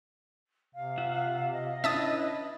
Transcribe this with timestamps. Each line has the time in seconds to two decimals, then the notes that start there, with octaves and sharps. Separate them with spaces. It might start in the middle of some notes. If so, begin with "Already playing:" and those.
0.75 C3 F5
0.98 F4 E5 F#5
1.53 D#5
1.84 C#4 D4 E4 B4 E5 A5 D#6